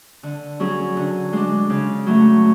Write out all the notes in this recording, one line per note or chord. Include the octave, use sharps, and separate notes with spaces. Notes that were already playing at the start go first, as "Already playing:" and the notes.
D3
F#3 C#4 G#4
D3
G#3 D4
C#3
F#3 A3